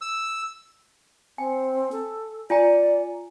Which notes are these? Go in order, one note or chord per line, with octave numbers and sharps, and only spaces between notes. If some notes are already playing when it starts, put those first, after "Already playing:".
E6
C4 G#5
A4
F4 D5 G#5 A#5